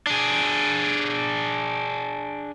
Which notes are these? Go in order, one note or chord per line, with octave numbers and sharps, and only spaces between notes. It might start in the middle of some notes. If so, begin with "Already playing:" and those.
D4 G#4